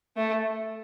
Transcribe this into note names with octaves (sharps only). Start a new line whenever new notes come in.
A3